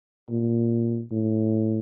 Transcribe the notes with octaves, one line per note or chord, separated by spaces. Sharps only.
A#2
A2